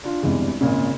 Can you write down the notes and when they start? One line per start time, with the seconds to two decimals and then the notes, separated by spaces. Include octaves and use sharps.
0.04 D4 F4
0.22 E2 G2 C3 E3 G#3
0.61 G#1 A#2 C#3